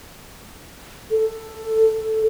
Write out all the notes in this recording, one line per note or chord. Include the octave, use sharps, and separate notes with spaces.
A4